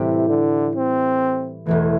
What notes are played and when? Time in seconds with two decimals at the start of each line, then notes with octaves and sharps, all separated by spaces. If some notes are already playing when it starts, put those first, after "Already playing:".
Already playing: A2 C3 E3 G3 E4 G4
0.29 D3
0.75 C4
1.66 E1 E2 E3 A3